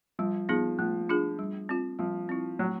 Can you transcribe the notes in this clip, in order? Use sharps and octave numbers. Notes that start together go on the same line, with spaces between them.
F3 G3
F3 B3 D#4 G#4
F3 A3
D4 F4 G#4
G3
C4 F4
F3 G3
C4 E4
F#3 A3